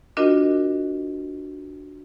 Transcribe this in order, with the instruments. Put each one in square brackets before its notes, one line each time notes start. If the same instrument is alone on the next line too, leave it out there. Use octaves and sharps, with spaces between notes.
[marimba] D4 F4 F#4 A#4 D#5